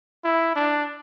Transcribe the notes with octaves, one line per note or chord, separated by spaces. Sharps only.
E4
D4